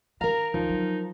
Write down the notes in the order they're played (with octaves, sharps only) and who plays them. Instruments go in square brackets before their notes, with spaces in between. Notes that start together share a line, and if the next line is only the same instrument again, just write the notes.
[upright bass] D#3 [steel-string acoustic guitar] A#4 F5 [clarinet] A#5
[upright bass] D#2 [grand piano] F3 [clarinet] D#4
[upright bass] F#3